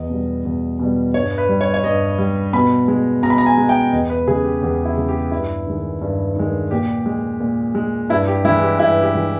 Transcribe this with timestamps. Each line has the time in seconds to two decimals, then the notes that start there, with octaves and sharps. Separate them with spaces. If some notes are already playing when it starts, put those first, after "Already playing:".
Already playing: E2 D#5
0.10 B2 G3
0.45 E2
0.79 B2 G3
1.14 G2 C#5
1.38 B4
1.49 G3
1.61 C#5
1.74 C#5
1.83 G2 D#5
2.19 G3
2.53 B2 B5
2.88 G#3
3.23 B2 A#5
3.30 B5
3.38 A#5
3.46 G#5
3.57 G#3
3.69 G5
3.92 E2 D#5
4.10 B4
4.27 C#3 G#4
4.30 G#3
4.44 G4
4.62 E2 G4
4.85 E4
4.97 C#3 G#3
5.08 G4
5.31 G2 E4
5.66 D#3 G#3
6.01 G2
6.36 D#3 G#3
6.71 A#2 G4
7.06 G#3
7.40 A#2
7.75 G#3
8.09 G2 E4
8.27 G4
8.45 G#3 E4
8.48 E3
8.62 G4
8.79 G2 E4
9.03 G4
9.14 E3 G#3